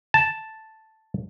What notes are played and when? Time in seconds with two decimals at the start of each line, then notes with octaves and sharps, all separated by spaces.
0.14 A5